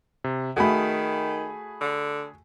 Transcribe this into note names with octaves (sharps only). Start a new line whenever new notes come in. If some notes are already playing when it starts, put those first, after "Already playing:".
C3
D#3 A3 F#4 G#4 G#5 B5
D3